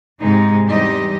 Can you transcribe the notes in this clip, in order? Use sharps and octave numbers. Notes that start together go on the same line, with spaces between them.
G#2 C3 G#3 D#4
E2 G3 C4 D#4 G4 D#5